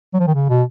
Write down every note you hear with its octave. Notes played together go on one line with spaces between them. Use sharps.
F#3
F3
D#3
C#3
B2